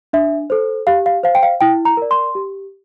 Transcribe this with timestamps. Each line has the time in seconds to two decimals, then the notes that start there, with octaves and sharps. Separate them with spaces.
0.13 D4 E5
0.50 A4 C5
0.87 G4 F5
1.06 F5
1.24 C5 F5
1.35 G5
1.43 F5
1.61 E4 G5
1.85 A#5
1.97 A#4 D5
2.11 C6
2.35 G4